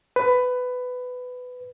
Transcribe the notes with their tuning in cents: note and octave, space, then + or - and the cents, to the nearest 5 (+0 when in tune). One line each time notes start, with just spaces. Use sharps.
B4 +15